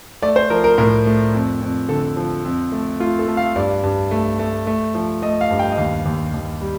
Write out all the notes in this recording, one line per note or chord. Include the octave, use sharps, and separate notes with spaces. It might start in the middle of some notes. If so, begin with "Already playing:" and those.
A3 D5
C5
F3 A#4
A#4
A2 A#4
A3
F2
F2
D3 A4
F3
F2
A3
A3 F4
A4
A3
F5
G2 D5
G2
A3
A3
A3
F3
A3 D#5
F5
G2
G5
D#5
D#2 F5
D#2
D#2
G3